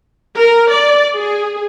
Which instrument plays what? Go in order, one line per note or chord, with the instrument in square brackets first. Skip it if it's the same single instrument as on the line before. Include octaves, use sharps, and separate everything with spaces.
[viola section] A#4
D5
G#4